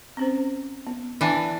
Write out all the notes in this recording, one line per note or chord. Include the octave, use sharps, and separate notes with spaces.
C4 C#4 C5
B3
E3 D4